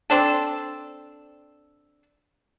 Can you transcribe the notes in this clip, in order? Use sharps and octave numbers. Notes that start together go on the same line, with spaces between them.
C4 D4 A4